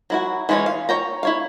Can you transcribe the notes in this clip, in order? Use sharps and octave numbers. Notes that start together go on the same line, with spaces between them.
F#3 E4 F#4
E3 G#3 C#4 F#4 C#5
F5
C#5 G5 A#5
E4 C#5 F5